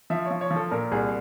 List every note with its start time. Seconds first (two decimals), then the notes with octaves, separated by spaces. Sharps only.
0.10 F3 E5
0.26 C#5
0.31 F3
0.41 C#5
0.51 F3
0.56 A4
0.71 A#2 A#4
0.92 C2 G#4